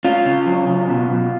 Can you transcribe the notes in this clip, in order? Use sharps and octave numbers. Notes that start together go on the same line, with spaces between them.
C#4 F4
C#3
F#3
C#3
B2
B2